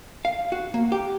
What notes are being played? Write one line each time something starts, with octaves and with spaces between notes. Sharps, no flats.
F5
F#4
A#3
G4